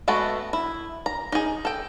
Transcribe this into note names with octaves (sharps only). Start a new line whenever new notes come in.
G#3 A3 B3 F#4 A4
E4
A#5
D#4 G#4
A4 G5